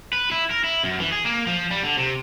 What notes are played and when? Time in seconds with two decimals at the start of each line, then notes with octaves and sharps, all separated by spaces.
0.13 B4
0.31 E4
0.51 A#4
0.64 E4
0.83 F#2
0.99 E3
1.12 G#4
1.25 A#3
1.47 F3
1.71 G3
1.84 D3
1.97 C3